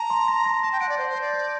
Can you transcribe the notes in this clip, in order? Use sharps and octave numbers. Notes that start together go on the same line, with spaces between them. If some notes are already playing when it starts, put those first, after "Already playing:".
Already playing: A5 A#5
C6
A#6
A#6
A5 A#6
G5
F#5 D7
D5
C5 G6
C5
G6
D5
G6